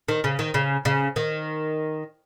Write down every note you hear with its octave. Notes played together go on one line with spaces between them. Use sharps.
D#3
C#3
D#3
C#3
C#3
D#3